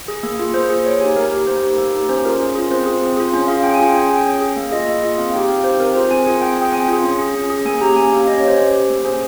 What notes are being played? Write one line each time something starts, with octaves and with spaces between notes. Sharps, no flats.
G#4
A#3
F4 G#4
A#3 C5
F4 G#4
A#3 C#5
D#4 G4 G#5
A#3 A#4
D#4 G4 A#4
A#3 C5
D#4 G4
A#3
D#4 G4
C#4 C5
F4 G#4 A#4
C#4
F4 G#4
C4 C5
F4 G#4
C4
F4 G#4
C#4
F4 G#4 F5
C#4 G5
G#5
F4 G#4
G5
C#4 G#5
G#4 G5
C#4
G#4
A#3 F5
F4 G#4 D#5
A#3
F4 G#4
C4 F5
D#4 G4 G5
C4 F5
D#4 G4 C5
C4 A#4
F4 G#4 C5
C4 G#5
F4 G#4 G#5
C4 G5
F4 G#4 G5
C4 G#5
F4 G#4
C#4
G#4
C#4
G#4
A#3 G#5
C#4 G4 A#5
A#3 G#5
C#4 G4 F5
C#4 D#5
C#5
G4
C5
C#4 C5
G4
A#3
C#4 G#4 C5